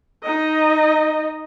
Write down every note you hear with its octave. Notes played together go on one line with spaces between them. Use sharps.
D#4 D#5